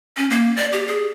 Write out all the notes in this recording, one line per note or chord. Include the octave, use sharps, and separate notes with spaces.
C#4
A#3
D5
G4
G#4